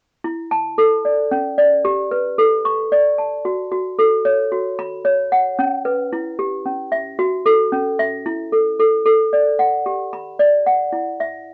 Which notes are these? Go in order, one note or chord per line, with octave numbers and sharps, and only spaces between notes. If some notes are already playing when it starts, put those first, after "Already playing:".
E4
A5
A4
D5
C#4
D5
G4
B4
A4
C#6
D5
A5
F#4
F#4
A4
C#5
F#4
B5
C#5
F#5
C#4
B4
E4
G4
C#4
E5
F#4
A4
C#4
E5
E4
A4
A4
A4
D5
F#5
G4
B5
D5
F#5
E4
E5